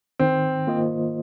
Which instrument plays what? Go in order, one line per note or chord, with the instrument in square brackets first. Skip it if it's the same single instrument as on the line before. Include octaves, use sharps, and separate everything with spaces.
[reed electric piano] D#3 [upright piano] C4
[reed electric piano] A#3 F4 C5 D#5